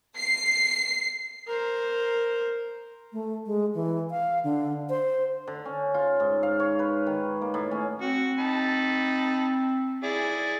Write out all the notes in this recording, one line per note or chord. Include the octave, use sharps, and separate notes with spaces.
C7
A#4 C5
A3
G#3
E3
F5
D3
C5
D3
C#4
F4
G#2
F5
C#5
B4
D#3
A#3
A2
C#4
C4 F#4
D#4 A5 B5
E4 G#4 D5